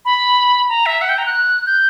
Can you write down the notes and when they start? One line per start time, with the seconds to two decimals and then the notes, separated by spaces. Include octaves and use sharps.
0.05 B5
0.69 A#5
0.86 E5
1.02 F#5
1.09 G5
1.18 A#5
1.26 F#6
1.66 G6